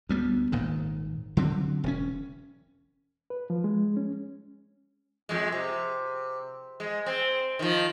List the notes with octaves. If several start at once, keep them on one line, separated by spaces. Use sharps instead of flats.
D2 G3 B3
D#1 G#1 A#2 D#3
D3 F#3 C4
E1 G#2 C#4
B4
F3
G#3
C#4
F2 G#3
C3
G#3
C4
D#3 F3